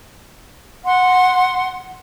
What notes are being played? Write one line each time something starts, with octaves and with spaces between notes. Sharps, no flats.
F#5 C6